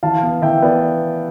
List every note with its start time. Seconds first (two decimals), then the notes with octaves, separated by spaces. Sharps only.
0.03 E3 F5 A5
0.23 B3
0.42 E3 E5 G5
0.62 B3 B4 D5